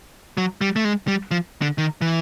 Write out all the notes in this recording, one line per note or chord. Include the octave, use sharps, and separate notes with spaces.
F#3
G3
A3
G#3
G3
F3
D3
D#3
E3